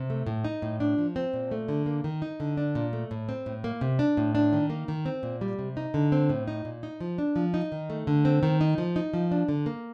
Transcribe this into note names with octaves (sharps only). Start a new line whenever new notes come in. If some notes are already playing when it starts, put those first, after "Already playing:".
Already playing: C3
A3
A2
D#4
A2
D4
F3
C4
A#2
A3
D3
A#3
D#3
D#4
D3
D4
A#2
A3
A2
C4
A2
A#3
C3
D4
A2
D4
D#3
A#3
D#3
C4
A#2
G3
C3
D#4
D3
C4
A2
D#4
A#2
D#4
F3
D4
F3
D#4
D#3
A3
D3
C4
D#3
D#4
F3
D#4
F3
D4
D3
A#3